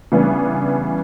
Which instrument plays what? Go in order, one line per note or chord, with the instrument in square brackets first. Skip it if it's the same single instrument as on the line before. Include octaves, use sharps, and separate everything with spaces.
[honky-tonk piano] C#3 E3 G3 B3 D4